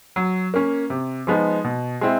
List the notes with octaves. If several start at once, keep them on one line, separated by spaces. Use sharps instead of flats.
F#3
A#3 C#4
C3
F3 G#3 B3 D#4
B2
G#3 C4 E4